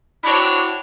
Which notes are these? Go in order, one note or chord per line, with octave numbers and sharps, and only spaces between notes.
C4 D4 E4 F#4 C#5